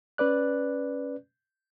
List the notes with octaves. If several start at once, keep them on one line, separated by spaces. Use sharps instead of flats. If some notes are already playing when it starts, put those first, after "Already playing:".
C#4 B4 D5 F#6